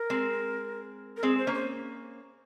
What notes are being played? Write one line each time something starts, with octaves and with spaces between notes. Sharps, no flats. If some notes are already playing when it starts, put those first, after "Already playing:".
Already playing: A#4
G#3 C4
A#4
G#3 C4 G#4
C5
A#3 C#4
C5